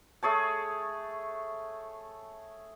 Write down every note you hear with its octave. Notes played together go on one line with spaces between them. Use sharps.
A3 G#4 C#5 A5